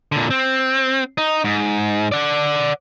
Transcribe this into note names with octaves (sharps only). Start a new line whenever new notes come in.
A#2 D3
C4
D#4
G#2
D5 F#5